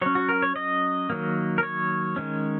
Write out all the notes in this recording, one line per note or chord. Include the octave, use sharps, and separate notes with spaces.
F#3 C#4 C#5
F#4
A#4
C#5
D#5
D#3 F#3 A#3
A#4
C#5
D#3 G#3 C#4